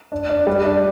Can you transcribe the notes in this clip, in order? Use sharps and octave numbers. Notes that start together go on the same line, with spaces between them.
D4
D4
G3
D4